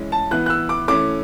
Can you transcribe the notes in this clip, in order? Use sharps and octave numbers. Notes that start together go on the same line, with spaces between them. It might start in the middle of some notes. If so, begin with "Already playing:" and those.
Already playing: E3 G#3 C#4
A5
E3 B3 F#6
F#6
E6
D6
E3 A3 C#4 D6